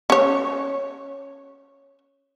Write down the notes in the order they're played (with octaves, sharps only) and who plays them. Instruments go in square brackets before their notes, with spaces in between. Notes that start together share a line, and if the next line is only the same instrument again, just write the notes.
[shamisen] C#4 C#5